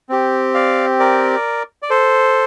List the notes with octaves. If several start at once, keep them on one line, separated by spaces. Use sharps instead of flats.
C4 G4
D5 F5
A#4 D5
D5
A4 C5